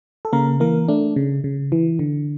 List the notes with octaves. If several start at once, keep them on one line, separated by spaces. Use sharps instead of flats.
A4
C#3 A#3 A#4
E3 A#3 A#4
A3 D4
C#3
C#3
E3
D3